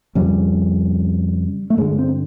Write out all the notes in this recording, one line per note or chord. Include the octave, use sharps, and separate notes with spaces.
F2 C#3 G3
A3
G2 D3 G#3
C4